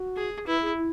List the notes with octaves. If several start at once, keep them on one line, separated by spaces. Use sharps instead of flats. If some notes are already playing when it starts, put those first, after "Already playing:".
Already playing: F#4
G#4
E4 B4
G#4
E4